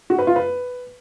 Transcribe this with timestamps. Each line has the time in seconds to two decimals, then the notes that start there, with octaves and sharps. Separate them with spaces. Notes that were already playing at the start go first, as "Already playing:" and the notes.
0.10 F#4
0.18 B4
0.27 F4
0.36 B4